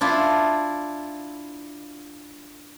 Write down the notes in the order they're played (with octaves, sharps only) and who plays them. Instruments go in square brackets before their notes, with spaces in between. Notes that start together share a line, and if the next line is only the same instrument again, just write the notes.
[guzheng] D4 E4 F4